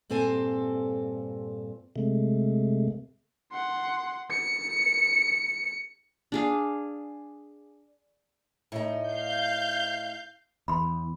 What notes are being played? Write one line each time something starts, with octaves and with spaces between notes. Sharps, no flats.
G2 A#2 C4 A4 C5 G#5
C3 G#3 A3
F#5 C6
C#7
D4 G#4 F5
A2 D#4
F5 G6
E2 B5 C6